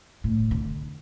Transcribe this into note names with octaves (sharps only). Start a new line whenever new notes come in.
A2
D3